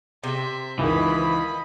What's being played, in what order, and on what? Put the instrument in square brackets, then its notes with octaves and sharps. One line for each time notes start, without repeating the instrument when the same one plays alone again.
[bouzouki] C3 [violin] E5 C6
[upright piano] C#2 D#3 [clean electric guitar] E3 [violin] D#5 B5